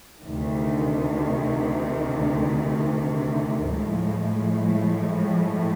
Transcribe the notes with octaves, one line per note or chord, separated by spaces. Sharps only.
D2 C3 D#3
A2 F3 G#3